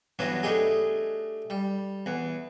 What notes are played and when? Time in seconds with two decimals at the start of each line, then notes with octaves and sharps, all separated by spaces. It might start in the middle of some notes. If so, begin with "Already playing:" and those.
0.19 E2 G2 F#3 B3
0.43 A3 D4 D#4 G4 G#4
1.50 G3
2.06 E2